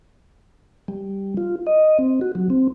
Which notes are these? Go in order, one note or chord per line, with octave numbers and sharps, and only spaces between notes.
G3
F4
D#5
C4
F#4
F#3
C4